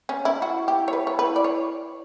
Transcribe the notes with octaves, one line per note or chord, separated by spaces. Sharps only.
C#4
E4
E4 F#4
G4
C#5
B4
C#5
B4
D5
C#5